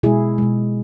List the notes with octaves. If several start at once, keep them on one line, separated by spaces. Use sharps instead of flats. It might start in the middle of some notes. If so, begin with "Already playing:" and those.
B2 G#3 E4 G#4
B2 G#3